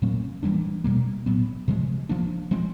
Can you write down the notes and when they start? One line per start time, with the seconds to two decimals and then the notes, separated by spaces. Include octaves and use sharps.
0.02 A#2 F#3 A#3 C#4
0.43 E3 G3 A#3 D4
0.84 B2 G3 A#3
1.26 A#2 F#3 B3
1.68 C3 F3 G#3
2.09 F3 A#3 D4
2.51 F3 G#3 C4